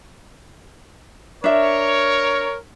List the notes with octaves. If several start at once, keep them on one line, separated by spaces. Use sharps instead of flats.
D4 A#4 C#5 E5